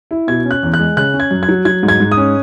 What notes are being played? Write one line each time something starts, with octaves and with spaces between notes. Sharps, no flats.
E4
B2 G#6
C#4
F#6
E2
F#6
G#3
C#3 F#6
C#4
G#6
F#2
G#6
F#3
F#3 G#6
G#2
G#6
G#2
D#6
C#4